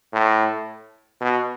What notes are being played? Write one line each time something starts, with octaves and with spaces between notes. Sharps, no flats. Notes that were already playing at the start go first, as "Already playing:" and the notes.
A2
B2